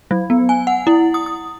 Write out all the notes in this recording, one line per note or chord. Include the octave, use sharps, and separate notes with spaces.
F#3
B3
G#5
F#5
E4
D#6
D#6